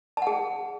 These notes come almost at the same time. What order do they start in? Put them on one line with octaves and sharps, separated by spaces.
A5 F#5 G#4